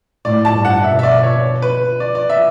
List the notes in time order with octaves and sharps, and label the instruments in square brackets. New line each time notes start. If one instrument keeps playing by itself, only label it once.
[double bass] A2 [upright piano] D5
[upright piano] A5
[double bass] G2
[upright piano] F#5
[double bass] B2 [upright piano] E5
[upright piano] E5
D5
C#5
B4
D5
D5
E5